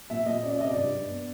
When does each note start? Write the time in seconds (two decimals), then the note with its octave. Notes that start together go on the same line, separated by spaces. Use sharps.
0.10 A#2 E5
0.26 A#2 D#5
0.43 C#4 D5
0.51 E5
0.60 C3 D#5
0.68 D5
0.77 G2
0.94 G2
1.10 B3